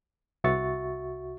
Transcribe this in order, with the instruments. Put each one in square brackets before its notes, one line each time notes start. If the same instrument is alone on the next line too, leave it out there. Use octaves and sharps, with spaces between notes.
[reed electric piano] C2 F#4 E5 C#6 A6